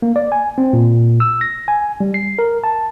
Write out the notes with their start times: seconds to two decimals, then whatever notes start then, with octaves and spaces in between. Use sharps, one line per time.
0.02 A#3
0.16 D5
0.32 G#5
0.58 C4
0.73 A#2
1.20 E6
1.41 A#6
1.68 G#5
2.00 G3
2.14 C7
2.39 A#4
2.64 A5